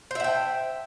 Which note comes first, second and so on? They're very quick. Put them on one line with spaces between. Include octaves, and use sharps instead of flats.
C5 E5 F#5 G5